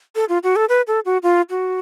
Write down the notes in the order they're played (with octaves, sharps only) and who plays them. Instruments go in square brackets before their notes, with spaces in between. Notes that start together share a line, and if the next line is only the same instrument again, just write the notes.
[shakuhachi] A4
F4
F#4
A4
B4
A4
F#4
F4
F#4